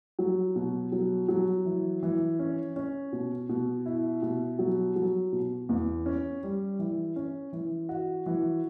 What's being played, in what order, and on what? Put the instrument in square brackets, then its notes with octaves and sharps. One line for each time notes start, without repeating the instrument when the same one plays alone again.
[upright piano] F#3
B2
F#3
F#3
E3
E3
C#4
C#4
B2
B2
E4
B2
F#3
F#3
B2
E2
C#4
G3
E3
C#4
E3
F#4
E3